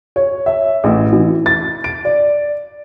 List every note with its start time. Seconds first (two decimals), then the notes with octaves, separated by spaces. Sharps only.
0.16 C#5
0.46 E5
0.84 A1
1.13 E3
1.46 A6
1.84 D7
2.05 D5